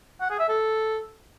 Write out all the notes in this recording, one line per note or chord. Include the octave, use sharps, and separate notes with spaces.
F#5
G#4
E5
A4